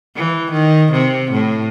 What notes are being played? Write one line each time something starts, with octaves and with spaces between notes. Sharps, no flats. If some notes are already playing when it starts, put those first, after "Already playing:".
E3
D#3
C3
A2